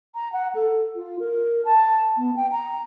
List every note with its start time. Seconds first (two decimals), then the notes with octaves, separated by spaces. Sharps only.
0.15 A#5
0.33 F#5
0.55 A4
0.96 F4
1.19 A#4
1.65 A5
2.17 B3
2.36 G5
2.52 A#5